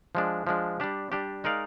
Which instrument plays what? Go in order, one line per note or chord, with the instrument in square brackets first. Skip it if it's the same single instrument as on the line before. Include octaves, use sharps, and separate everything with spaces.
[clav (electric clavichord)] F3 G#3 D4
F3 G#3 D4
G3 D4 G4
G3 D4 G4
G#3 D#4 A#4 D5 F5